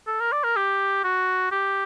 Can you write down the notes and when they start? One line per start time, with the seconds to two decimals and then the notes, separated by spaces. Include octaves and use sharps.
0.07 A4
0.20 A#4
0.32 D5
0.44 A#4
0.56 G4
1.04 F#4
1.52 G4